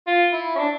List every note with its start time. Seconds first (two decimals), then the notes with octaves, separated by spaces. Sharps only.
0.07 F4
0.33 E4
0.55 C#4
0.59 D4